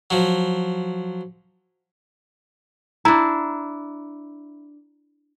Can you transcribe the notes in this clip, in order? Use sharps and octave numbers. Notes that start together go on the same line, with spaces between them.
F3 F#3
D4 E4 A#5